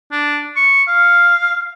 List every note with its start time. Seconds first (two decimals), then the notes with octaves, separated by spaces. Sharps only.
0.12 D4
0.56 C#6
0.88 F5